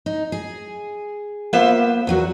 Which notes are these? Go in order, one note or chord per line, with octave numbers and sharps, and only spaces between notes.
D#4
G#4
A#3 B3 F4 B4 C5 E5
E2 F#3 F#4